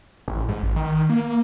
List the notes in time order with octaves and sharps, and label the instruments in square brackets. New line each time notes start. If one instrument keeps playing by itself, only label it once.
[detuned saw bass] A1
G#2
A1
D#3
A#3